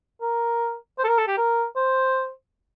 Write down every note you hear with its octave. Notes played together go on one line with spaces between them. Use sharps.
A#4
C5
A4
A#4
A4
G4
A#4
C5